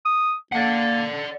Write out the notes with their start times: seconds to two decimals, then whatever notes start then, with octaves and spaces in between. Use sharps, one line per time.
0.05 D#6
0.52 A#3 D5 F#5